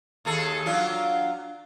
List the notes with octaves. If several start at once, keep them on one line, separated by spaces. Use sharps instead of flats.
D#2 G#4 A4
F#3 D4 F4